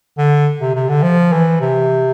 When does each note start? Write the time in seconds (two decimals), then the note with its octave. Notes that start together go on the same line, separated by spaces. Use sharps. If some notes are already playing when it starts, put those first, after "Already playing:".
0.18 D3
0.61 C3
0.75 C3
0.89 D3
1.03 F3
1.32 E3
1.60 C3